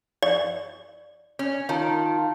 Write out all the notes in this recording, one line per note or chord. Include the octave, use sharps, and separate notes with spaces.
D5
C#4
D#3 F4 A5